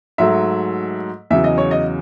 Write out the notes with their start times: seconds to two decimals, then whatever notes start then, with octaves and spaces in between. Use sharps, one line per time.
0.18 G#2 F#3 A3 E5
1.30 E2 C#3 F#3 E5
1.44 D#5
1.58 C#5
1.71 D#5